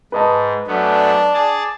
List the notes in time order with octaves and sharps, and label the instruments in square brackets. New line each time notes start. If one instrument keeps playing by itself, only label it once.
[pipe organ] G#2 [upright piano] B4 D#5 A5
[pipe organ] F#2 A3 B3 [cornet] D4
[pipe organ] G#4 D5 A5